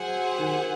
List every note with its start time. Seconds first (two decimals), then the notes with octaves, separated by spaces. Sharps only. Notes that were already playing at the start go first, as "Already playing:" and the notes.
Already playing: F#3 G#4 C5 F#5
0.39 D#3